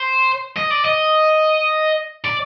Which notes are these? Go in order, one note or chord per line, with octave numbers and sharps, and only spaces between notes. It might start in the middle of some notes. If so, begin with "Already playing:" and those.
Already playing: C5
D#5
D5
D#5
D5